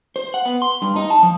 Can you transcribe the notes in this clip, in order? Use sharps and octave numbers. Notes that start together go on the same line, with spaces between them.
C5
F#5
B3
C6
G2
D#4
A5
F3